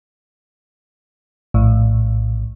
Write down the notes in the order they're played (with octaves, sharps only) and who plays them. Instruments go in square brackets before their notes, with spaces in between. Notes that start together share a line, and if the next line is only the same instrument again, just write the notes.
[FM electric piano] A#1 A2